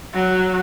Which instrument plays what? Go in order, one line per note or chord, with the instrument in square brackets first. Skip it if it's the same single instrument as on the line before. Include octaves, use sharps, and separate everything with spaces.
[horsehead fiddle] F#3